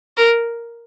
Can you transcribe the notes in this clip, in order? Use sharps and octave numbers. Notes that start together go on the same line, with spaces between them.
A#4